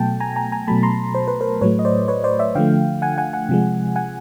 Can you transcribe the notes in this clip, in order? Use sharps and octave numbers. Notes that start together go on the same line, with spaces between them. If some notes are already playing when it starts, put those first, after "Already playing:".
Already playing: B2 F#3 A3 G5 A5
G#5 A#5
G#5 A#5
G#5 A#5
B2 F#3 A3 A5 B5
A#5 C6
C5
B4
A#4 C5
A2 F#3 A3 B4 C#5
D#5
C5 D5
B4 C#5
C5 D5
D5 E5
D3 F3 A3 F5 G5
F#5 G#5
F#5 G#5
F#5 G#5
C3 F3 G#3
F#5 G#5